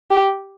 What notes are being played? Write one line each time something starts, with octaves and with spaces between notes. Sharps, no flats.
G4